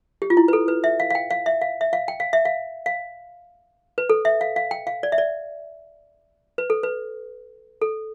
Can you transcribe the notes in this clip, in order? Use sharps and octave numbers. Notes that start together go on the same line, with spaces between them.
G4
F4
E4
B4
A4
B4
E5
F5
F5
G5
F5
E5
F5
E5
F5
G5
F5
E5
F5
F5
B4
A4
E5
F5
F5
G5
F5
D5
E5
D5
B4
A4
B4
A4